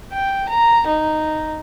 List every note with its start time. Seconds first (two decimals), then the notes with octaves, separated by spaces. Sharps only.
0.12 G5
0.49 A#5
0.87 D#4